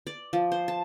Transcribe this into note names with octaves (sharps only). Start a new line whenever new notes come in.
D5
F3
C5
A5